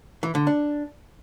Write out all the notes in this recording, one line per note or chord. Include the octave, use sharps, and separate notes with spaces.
E3
D3
D4